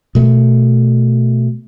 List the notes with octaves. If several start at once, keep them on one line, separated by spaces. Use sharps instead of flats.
B2 A3